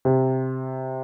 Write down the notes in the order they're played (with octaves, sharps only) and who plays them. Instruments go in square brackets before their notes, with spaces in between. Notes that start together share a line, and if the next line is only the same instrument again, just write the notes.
[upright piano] C3